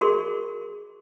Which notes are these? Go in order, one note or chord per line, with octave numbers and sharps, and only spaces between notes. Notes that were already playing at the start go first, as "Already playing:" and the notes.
F#4 G#4 A#4 C6 C#6